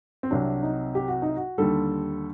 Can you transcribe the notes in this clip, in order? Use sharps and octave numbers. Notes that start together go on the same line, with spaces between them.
C4
C2 C3 F#3 D4
D#4
G4
F#4
D#4
F#4
D#2 D3 G3 A4